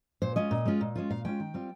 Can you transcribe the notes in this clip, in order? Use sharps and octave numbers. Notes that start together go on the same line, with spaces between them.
A#2 C5
G#3 C#4 F4 D#5
A#2
G#3 C#4 F4
A#2
G#3 C#4 F4
A#2 F5
G#3 C#4 F4 G5
D#3
G3 C4 F4